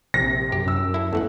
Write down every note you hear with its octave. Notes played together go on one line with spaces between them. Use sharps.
A#1 C3 A#6
F#2 G4
E6
E4 A4
E2 E3 A3 F#5